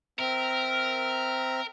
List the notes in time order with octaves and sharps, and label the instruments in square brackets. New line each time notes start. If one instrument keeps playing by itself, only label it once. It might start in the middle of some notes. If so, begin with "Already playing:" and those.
[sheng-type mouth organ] C4 E5 F6 [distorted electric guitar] A#4